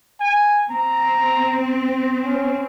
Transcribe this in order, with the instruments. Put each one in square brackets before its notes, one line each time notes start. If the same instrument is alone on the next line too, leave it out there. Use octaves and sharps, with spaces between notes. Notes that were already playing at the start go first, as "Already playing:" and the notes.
[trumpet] G#5
[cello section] C4 [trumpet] A#5
[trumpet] C#4